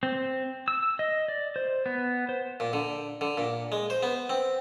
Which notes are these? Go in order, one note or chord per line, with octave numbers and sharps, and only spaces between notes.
C4
E6
D#5
D5
C5
B3
C5
A#2
D3
D3
A#2
G#3
C5
B3
C4